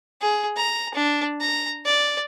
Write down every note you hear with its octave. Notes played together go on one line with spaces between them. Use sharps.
G#4
A#5
D4
A#5
D5